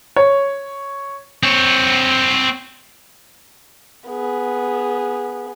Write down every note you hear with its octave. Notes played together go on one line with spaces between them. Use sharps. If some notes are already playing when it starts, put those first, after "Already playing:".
C#5
C4 C#5
B3 G#4